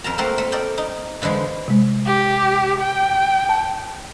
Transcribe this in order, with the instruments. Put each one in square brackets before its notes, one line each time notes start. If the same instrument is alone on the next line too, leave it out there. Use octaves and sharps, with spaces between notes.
[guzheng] F2 A#4 A5 A#5
A3 A#3 C4 F#4 A4 A#4
A3
A4 A#4 D5 D#5 G5
D#4
D3 E3 F3 G#3 D4
[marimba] C3 G#3
[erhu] G4
G5
[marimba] A5